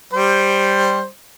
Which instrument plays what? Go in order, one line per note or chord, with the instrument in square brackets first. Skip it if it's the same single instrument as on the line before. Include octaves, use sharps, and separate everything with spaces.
[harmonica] G3 C5